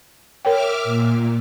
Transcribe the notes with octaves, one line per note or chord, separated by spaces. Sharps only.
A#4 C#5 E5 G5 D6 F6
A#2